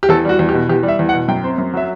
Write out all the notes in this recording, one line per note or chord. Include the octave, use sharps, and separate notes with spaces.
G4
E2 A4
G3 F#4
E2
G4
B2
E2 G4
G3
E5
E2
F#5
B2
F#2 G5
C4
F#2
F#3 E5